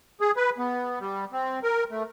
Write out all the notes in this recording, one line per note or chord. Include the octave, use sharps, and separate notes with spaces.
G#4
B4
B3
G3
C4
A#4
A3